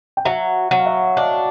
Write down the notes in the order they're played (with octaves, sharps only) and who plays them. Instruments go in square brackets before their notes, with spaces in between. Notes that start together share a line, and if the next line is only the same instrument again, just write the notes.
[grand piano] G5
[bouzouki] F#3 [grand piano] E5 F#5
[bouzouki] F#3
[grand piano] F5
E5 F#5
[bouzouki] D4 [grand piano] D#5 F5